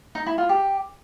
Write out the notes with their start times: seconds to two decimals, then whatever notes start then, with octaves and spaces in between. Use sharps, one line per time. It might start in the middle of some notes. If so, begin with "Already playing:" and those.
0.15 D#4
0.26 E4
0.38 F4
0.49 G4